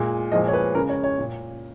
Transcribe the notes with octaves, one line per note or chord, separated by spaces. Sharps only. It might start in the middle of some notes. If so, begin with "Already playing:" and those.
Already playing: A#2 G#3
A#2 F3 G#3 D#5
C#5
B4
C#3 G#3 A#4
C#5
C#5
A#2